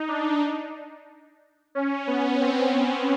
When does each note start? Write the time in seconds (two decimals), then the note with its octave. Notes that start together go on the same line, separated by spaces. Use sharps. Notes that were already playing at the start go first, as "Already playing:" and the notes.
Already playing: D#4
0.08 D4
1.75 C#4
2.07 B3
2.40 C4